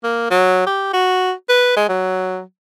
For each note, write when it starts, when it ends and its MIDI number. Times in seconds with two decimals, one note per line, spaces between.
0.04 0.30 58
0.31 0.65 54
0.66 0.93 67
0.93 1.32 66
1.49 1.76 71
1.76 1.86 56
1.89 2.41 54